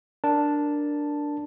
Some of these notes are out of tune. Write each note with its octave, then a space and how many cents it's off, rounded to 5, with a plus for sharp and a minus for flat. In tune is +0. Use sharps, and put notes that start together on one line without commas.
D4 +0 A#4 +0 A5 +0